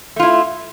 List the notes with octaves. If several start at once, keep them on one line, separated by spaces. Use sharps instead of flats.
A3 E4 F4